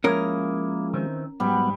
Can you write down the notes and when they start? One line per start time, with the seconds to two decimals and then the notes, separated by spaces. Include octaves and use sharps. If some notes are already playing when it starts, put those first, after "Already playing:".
0.04 F3 G#3 A#3 C#4 E4 G#4 A#4
0.94 D#3 E3 C4
1.40 G#2 F#3 G3 B3 F#5